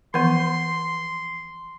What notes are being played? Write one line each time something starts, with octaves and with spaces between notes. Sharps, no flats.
E3 F3 B3 C6